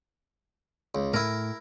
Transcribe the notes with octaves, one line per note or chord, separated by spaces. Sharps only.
C#2
A2 E4 A#4